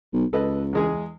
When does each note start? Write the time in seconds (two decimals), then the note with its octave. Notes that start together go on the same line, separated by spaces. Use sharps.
0.13 B1
0.33 C#2 A4 B4 D#5
0.73 E2 G#3 G#4